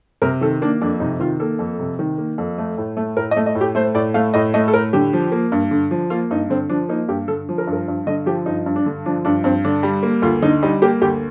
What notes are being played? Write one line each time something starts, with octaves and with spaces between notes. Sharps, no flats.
C3 A#4
D#3 A4
A#3 D4
F2 D4
C3 D#4
D#3 F4
A#3 A4
F2
C3
D#3
A#3
F2
A3
A2
A3
A2 A#4
D#5
A3
D#5
A2
G4
A3 C5
A2 D5
A3 F5
A2 D#5
A3 D#5
A4
A2 A#4
D3 G4
F3
A#3
G2
D3
F3
A#3 F4
G2 D#4
D3 C4
F3 D4
A#3 D#4
G2 G4
D3 A4
F3
A#4
G2
A#4
G2
D3 D#5
F3 G4
G2 D#4
G2
D4
D3
F3 D4
G2 D4
G2 C4
D3 D4
G3
A#3
D2 F4
D3 D#4
G3 D#4
A#3 G4
D2 G4